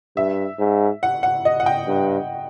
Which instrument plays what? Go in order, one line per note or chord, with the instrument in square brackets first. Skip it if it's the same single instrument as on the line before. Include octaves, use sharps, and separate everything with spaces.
[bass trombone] G2 [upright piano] E5
[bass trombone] G#2
[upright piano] F#5
F#5
D#5
F#5
G5
[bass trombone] G2